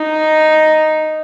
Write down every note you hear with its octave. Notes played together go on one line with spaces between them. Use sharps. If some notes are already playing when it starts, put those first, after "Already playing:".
Already playing: D#4